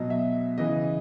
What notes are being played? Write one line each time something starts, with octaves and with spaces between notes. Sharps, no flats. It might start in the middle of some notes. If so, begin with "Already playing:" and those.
Already playing: B2 F#3 D#5
E5
C#3 E3 D#5